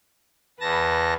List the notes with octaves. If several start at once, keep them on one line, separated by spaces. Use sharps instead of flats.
E2 B4 A5 A#6